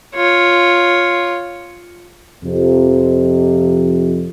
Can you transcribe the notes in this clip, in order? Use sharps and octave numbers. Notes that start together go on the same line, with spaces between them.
F4 C#5
F2 C3